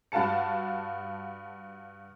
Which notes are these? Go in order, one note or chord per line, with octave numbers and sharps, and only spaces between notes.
G2 F#4 F5 A5 C#7